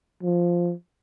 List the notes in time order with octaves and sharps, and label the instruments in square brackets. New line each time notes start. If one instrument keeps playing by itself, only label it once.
[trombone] F3